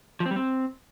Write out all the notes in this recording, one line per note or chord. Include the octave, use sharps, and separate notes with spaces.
F3
C4
G3
C4